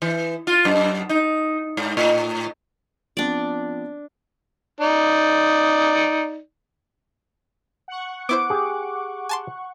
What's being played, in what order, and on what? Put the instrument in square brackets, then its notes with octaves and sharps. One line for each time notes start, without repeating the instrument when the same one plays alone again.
[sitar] E3
F4
F#2
D#4
G#2
A2
[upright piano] F3 B3 C4 [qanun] D4 D5
[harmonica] D#4 D5
[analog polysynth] F#5 C#6
[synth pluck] B3 E4 C5 [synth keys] D6
[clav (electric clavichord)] G4 G#4
[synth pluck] G#5 A5 C6